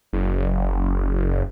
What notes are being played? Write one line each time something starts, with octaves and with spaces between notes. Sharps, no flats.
F#1